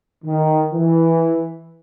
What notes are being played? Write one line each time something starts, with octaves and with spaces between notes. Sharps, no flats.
D#3
E3